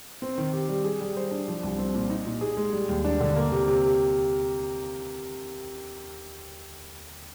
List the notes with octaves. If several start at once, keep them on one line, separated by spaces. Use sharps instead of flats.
C4
D#3
G4
G3
G#4
G3
C5
D4
F3
C2
C4
A#2
D#4
A#2
G#4
G#3
G3
D#2
D4
D3
A#3
C3
C3